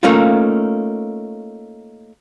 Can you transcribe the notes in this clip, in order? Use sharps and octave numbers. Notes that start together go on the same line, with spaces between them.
A3 A#3 C#4 D#4 F4